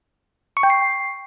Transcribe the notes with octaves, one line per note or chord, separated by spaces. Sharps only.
C#6
G5
C7